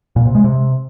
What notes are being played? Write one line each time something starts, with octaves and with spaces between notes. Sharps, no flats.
A#2
C3
G#3
C3